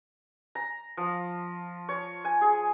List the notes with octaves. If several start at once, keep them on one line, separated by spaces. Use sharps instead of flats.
A#5
F3
C#5
G#5
G#4